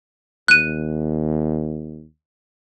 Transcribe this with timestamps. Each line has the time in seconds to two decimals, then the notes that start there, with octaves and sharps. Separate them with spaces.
0.48 D#2 F#6 D#7